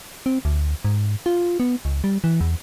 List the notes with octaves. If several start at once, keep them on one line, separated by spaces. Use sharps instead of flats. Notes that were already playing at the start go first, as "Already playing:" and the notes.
C4
D2
G#2
F4
B3
C#2
G3
E3
E2